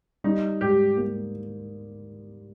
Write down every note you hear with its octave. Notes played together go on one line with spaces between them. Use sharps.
G3 D#4
G#2 G4
A#3